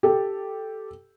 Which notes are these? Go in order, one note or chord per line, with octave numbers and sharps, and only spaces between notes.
G4 A4